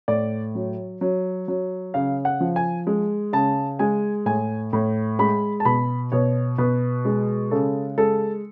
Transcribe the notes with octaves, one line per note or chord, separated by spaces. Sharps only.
A2 D5
F#3
F#3
F#3
C#3 F5
F#5
F3
G#5
G#3
C#3 A5
G#3 G#5
A2 G#5
A2
G#3 B5
A5
B2 B5
B2 C#5
B2 B4
G#3
C#3 A4
G#3 A4